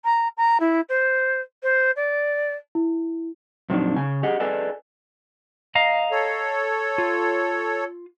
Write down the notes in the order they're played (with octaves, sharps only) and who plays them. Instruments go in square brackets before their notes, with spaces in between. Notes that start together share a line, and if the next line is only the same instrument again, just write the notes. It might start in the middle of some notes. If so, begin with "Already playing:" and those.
[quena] A#5
A#5
E4
C5
C5
D5
[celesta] E4
[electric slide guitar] F2 A#2 F#3 C4 D4 D#4
C#3 G#5
G4 G#4 D#5 F#5
G#4 A4 B4 D5 D#5 G#5
D#5 F5 A#5
[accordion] A4 C#5
[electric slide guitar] F4